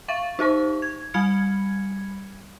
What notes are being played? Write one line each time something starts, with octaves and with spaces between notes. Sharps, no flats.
E5 F5 C#6 A6
D#4 G4 C5 C#6
G#6
G3 G#5 B5 F6 G#6 C#7